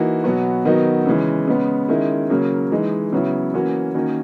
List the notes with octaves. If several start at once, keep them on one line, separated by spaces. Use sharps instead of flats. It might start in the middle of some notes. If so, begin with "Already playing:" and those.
Already playing: E3 A#3 D#4 F#4
B2 F#3 B3 F#4
D#3 F#3 B3 D#4 F#4
C#3 E3 G#3
C#3 G#3 B3
D#3 G#3 C#4 E4
C#3 F#3 A#3
E3 G#3 D#4
C#3 F#3 B3 E4
E3 A#3 C#4 F#4
D#3 A#3 C#4 F#4